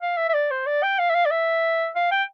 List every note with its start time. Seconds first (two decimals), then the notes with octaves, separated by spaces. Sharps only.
0.01 F5
0.17 E5
0.29 E5
0.34 D5
0.50 C5
0.66 D5
0.83 G5
0.99 F5
1.10 E5
1.15 F5
1.25 D5
1.31 E5
1.95 F5
2.11 G5